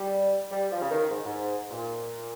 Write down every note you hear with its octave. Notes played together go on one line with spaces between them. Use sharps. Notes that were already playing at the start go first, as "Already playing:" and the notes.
Already playing: G3
G3
F3
C#3
D#3
G#2
G#2
A#2